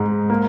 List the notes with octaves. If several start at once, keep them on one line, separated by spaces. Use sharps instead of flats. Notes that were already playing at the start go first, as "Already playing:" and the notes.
Already playing: G#2 D#4
A#3